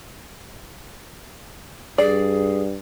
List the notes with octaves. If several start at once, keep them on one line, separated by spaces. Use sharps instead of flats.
G2 G#4 D5